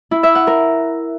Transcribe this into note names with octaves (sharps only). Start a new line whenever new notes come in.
E4
E5
F#5
A#4